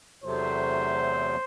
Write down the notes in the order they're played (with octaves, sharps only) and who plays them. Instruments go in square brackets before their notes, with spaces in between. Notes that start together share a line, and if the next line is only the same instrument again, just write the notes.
[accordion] E2 C3 F#3 A3 [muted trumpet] C5